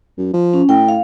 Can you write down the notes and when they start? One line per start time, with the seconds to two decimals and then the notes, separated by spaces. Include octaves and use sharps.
0.18 F#2
0.33 F3
0.54 C#4
0.69 A2 G5
0.89 F5